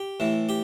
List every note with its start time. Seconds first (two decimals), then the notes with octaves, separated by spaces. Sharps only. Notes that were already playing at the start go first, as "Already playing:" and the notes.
Already playing: G4
0.20 A2 E3
0.49 G4